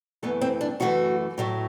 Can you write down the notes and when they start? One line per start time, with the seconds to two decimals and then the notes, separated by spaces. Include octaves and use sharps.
0.23 F#2 E3 A3 B3
0.41 C4
0.61 D4
0.80 F#2 E3 A3 F#4
1.38 A2 F#3 A3